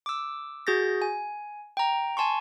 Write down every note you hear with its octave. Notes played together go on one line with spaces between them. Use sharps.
D6 E6
F#4 G#4 G6 A6 A#6
G#5
G5 A#5
G#5 A5 C6 C#6